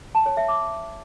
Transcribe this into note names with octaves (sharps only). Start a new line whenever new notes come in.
A5
C#5
E5
D6